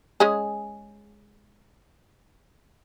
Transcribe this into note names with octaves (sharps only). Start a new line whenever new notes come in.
G#3 C#4 G#4